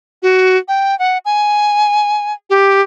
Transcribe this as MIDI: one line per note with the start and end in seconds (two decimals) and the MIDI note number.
0.23 0.57 66
0.68 0.97 79
0.99 1.18 78
1.25 2.33 80
2.50 2.81 67